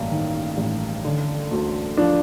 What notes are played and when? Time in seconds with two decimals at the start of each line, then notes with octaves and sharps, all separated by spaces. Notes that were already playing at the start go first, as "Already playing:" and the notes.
Already playing: A1 G2 A#3
0.11 D#3
0.57 A1
1.05 D3
1.51 D2
1.97 F3 D4